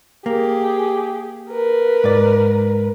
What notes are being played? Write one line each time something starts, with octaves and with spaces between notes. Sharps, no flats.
A#3 G4 G#4
A#4 B4
G#2 D5